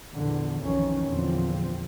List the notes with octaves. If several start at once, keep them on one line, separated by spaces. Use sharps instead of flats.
A#1 E2 D3
B1 F2 D#3 E3 C#4
E2 A#2 D3 F3 C4